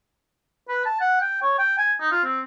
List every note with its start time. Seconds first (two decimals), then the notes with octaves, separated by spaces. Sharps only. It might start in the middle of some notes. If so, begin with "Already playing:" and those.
0.69 B4
0.86 A5
1.01 F#5
1.21 G5
1.42 C#5
1.58 G5
1.78 G#5
2.00 D#4
2.12 F4
2.24 C4